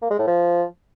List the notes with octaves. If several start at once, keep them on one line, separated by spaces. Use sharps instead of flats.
A#3
G#3
A2
F3